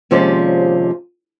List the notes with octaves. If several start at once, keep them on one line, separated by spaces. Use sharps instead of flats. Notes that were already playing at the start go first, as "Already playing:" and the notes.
D#2 C3 F3 G#3 C#4 D5